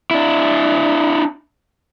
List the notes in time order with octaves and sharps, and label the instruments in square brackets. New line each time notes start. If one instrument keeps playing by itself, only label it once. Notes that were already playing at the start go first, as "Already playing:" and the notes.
[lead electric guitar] D4 E4